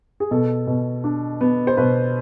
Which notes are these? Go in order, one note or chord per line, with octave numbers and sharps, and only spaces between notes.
G#4
B2 A4
B2
D4
B3
C5
B2 B4